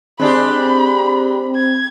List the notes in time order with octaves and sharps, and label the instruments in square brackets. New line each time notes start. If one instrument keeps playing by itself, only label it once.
[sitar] G#3 D4 G4 [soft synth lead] C4 [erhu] B5
[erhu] G#6